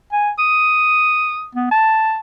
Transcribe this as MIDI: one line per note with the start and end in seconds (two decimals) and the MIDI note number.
0.12 0.30 80
0.38 1.48 87
1.55 1.70 59
1.71 2.20 81